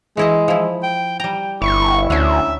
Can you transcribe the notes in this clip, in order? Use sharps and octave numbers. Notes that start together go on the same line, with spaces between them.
E3 G#3 E4 D#5
F3 E4
G5
G3 G5 A#5
G1 E4 C#6
D2 C#4 D4 E5